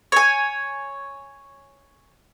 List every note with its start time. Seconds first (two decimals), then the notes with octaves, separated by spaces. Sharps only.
0.12 C#5 G#5